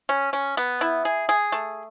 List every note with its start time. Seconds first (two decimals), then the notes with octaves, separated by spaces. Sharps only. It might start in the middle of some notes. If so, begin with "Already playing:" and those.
0.09 C#4
0.33 C#4
0.57 B3
0.81 E4
1.05 G#4
1.29 G#4
1.52 A3